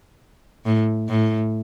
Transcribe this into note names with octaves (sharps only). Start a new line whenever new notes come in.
A2
A2